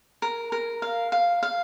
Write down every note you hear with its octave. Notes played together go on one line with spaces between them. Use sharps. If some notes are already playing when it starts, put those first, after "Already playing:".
A#4
A#4
F5
F5
F5